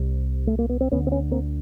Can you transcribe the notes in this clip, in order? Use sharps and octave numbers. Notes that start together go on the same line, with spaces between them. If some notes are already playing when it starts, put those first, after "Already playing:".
Already playing: C2 C3
A3
A#3
B3
C4
D2 D3 B3 C#4
C4
B3 C#4
A#3 C4